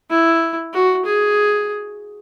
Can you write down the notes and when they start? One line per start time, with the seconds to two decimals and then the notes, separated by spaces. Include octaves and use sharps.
0.10 E4
0.73 F#4
1.05 G#4